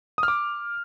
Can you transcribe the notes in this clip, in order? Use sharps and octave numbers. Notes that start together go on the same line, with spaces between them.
D#6
F6
D6